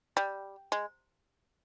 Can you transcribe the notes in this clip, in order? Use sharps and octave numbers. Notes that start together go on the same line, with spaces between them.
G3
G#3